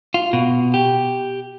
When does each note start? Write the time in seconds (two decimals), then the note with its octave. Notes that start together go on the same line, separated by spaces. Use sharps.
0.14 F4
0.33 B2
0.74 G4